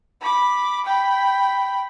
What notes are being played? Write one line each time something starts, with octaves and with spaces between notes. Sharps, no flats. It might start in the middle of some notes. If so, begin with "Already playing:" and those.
B5 D6
G5 B5